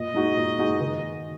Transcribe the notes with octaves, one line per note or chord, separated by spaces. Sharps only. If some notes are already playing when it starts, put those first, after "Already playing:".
Already playing: A#2 D#5
G#3 D#4 F#4
A#2
G#3 D#4 F#4
D#3